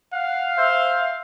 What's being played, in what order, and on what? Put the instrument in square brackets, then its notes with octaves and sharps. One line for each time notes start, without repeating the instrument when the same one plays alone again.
[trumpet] F5 [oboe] F#5
[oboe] C5 [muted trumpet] E5